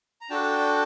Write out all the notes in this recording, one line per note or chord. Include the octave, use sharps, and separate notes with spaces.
A#5
D4 F#4 A4 G5 A5